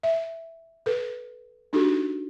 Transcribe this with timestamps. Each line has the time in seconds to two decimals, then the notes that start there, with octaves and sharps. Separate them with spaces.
0.03 E5
0.86 A4 B4
1.73 D4 D#4 F#4 G4 A4